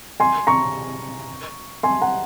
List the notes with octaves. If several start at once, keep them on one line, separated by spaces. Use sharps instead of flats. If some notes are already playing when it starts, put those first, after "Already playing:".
G#5 C6
A#5 C#6
G#5 C6
F#5 A#5